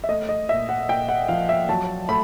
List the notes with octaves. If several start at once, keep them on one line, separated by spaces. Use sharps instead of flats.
E5
A3 D#5
D#5
A#2 E5
F#5
A#2 G5
F#5
F3 F5
E5
F#3 A5
A3 B5